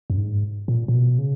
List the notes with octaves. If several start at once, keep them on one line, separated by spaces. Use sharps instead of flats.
F#2
G#2
A#2
A#2
B2
C#3